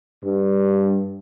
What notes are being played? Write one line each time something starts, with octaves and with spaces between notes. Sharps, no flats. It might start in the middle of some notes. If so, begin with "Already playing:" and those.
G2